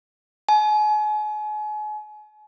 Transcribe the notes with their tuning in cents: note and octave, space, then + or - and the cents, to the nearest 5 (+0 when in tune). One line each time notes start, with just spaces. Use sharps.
G#5 +40